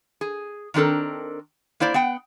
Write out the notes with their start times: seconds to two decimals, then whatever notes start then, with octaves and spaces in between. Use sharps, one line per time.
0.21 G#4
0.74 D#3 C4 D4 A4 A#4
1.80 A#3 E4 C5 D5
1.94 B3 F#5 G5